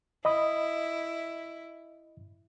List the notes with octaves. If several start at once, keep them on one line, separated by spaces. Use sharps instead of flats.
E4 D#5 B5 D#6